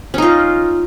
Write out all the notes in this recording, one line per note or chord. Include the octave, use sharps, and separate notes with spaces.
C#4 D#4 F4